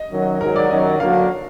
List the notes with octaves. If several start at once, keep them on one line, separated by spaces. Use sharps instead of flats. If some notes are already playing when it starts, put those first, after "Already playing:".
Already playing: D#5
F#2 D#3 F#3
G#2 D#3 F#3 A#4
D5
F#2 D#3 F#3 D#5
D3 F#3 A#3 D4 F#4 F5